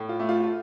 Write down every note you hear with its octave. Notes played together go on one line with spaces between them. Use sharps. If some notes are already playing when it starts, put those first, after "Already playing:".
Already playing: A2
F4
A3
F4
F4